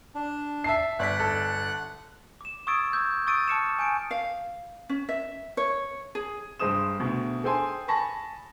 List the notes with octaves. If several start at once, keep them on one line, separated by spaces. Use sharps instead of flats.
D4
E5 A5 C7
G1 D5 F#5 F#6 B6
A4
D6 E7
C#6 D#6 E6 G#6 A6 D7
D6 E6 G6 G#6
C#6 D#6 E6 A6 D7 D#7
A5 D6 F6 C#7 D7 E7
G#5 G6 D7
F5
C#4
E5
C#5
G#4
G2 G#3 C5 D#6 E7
D2 B2
G#4 A4 C5 G5 G#5 C6
G#5 A5 B5 C#6 A#6